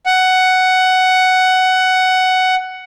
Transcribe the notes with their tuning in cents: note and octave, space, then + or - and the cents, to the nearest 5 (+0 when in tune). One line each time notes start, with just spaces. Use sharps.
F#5 +10